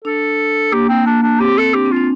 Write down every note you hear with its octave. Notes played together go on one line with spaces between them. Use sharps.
D4 A4
A#3 G4
C4
A#3 D4
A#3 D4
C4 G4
A4
D4 G4
C4
F4
D4